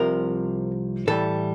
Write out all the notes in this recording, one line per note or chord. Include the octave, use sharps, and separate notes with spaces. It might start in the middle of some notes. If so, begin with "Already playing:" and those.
Already playing: C2 C3 F3 A#4
A2 E3 G3 A4